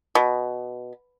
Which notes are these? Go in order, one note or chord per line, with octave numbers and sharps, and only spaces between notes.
B2